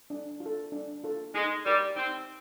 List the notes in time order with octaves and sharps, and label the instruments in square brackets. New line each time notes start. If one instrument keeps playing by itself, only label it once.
[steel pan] D4
F4
A4
D4
F4 A4
[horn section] G#3 [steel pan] D#4
[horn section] G3 [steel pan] G4 A#4 C#5
[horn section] C4 [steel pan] D#4